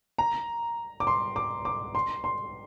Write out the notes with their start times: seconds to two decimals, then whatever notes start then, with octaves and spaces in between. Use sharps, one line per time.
0.18 A#5
1.00 D6
1.07 C6
1.36 D6
1.65 D6
1.95 C6
2.24 C6